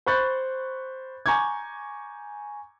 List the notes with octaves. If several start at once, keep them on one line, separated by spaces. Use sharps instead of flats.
C5 B5 C#6 F#6 G6 A6
G#5 A#5 C#6 D6 G6 G#6